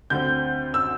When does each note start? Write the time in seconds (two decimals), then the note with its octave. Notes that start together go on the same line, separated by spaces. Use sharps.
0.10 D2 D3 C4 G6
0.74 E6